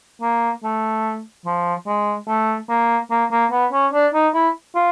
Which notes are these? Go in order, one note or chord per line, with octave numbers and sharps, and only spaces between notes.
A#3
A3
F3
G#3
A3
A#3
A#3
A#3
B3
C#4
D4
D#4
E4
F4